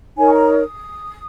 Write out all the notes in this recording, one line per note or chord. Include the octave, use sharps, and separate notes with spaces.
D#4 A#4 C#5 G#5
C#6
A#5
D#6